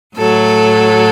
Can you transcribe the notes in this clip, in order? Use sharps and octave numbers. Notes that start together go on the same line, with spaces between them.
A2 F#3 A4